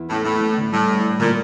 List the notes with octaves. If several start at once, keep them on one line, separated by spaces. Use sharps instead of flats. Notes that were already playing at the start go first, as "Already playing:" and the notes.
Already playing: E2 E4
A2 C#4
A2 A3
A3
D3
A2 G3
G2
G2
A#2 D3